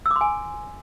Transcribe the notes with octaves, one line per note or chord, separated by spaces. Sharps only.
E6
D6
C6
G#5